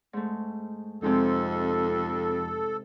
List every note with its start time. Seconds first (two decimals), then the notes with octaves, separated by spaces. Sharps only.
0.13 G#2 A3
1.02 F2 C3 G#3 D#4 A4